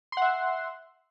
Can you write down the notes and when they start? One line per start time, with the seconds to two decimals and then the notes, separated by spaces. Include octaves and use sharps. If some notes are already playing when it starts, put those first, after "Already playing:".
0.12 C6
0.17 F#5
0.22 E5